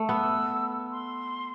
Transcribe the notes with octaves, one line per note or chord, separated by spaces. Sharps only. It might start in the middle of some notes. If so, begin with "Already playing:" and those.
Already playing: A3
B3 E6
C6